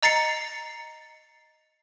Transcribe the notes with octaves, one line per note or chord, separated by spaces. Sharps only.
D#5 A#5 A6 C7 C#7